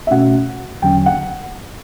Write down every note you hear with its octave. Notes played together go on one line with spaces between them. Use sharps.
E5
B2 A3 C#4 F#4 F#5
E2 D3 F#3 C#4 G5
F#5